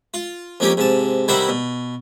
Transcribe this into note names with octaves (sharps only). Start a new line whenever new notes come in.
F4
F2 A#3 C#4 G4
G#2 C3 A5
C3 D#3 G3 E4 C5 F#5
B2